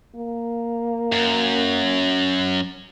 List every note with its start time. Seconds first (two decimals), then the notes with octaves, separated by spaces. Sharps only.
0.15 A#3
1.12 F#2